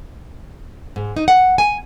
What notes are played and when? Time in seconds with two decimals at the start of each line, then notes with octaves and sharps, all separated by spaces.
0.96 G#2
1.16 D#4
1.28 F#5
1.58 G#5